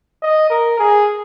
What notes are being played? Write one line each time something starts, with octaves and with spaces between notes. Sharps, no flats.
D#5
A#4
G#4